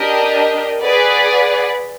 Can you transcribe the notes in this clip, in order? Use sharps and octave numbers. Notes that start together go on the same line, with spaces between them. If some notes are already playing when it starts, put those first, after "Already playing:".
Already playing: D4 G4 A#4 D#5 G5
G#4 B4 D5 F#5